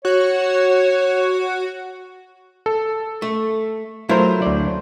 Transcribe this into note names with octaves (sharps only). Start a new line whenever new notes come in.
F#4 C#5
A4
A3
F#3 A3 E4 F4 A#4 C5
D2 D5